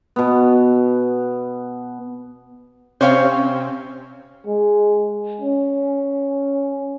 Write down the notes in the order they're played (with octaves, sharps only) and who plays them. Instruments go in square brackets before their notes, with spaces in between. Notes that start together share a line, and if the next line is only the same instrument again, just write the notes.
[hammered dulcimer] B2 B3
[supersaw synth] C3 C4 C#4 [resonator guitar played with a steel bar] C5 C#5 F5
[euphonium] G#3
C#4